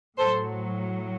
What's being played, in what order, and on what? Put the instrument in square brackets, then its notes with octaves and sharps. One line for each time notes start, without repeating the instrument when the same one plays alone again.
[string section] A2 F#3 A4 C5